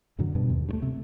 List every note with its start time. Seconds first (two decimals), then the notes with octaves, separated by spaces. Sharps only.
0.19 F#2 A#2 D3 F#3
0.35 G2 B2
0.50 D#2
0.69 G2 A3
0.82 C3